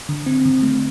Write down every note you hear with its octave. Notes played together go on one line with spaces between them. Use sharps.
D3
C4
D3
A3